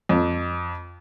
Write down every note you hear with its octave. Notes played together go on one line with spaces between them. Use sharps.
F2